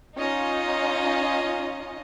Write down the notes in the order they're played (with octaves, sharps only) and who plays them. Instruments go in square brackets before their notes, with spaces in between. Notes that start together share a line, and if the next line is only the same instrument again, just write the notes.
[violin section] C#4 D#4 F4 D#5